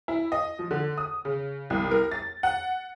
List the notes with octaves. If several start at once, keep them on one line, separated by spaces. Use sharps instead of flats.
E4
D#5
F3
D3
D#6
C#3
C2
A#4
A6
F#5